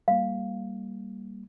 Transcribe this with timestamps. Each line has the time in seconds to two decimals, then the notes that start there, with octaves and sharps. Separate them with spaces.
0.08 G3 A#3 F5